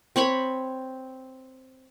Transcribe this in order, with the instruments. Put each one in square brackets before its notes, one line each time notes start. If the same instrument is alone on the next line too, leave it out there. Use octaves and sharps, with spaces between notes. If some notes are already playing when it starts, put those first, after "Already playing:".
[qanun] C4 C#5 B5 C#6